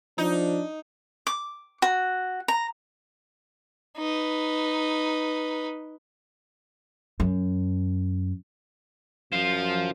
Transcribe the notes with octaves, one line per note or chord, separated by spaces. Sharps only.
F3 D4 D#4
D6
F#4
A#5
D#4 B4
F#2
F#2 F4 C5 F5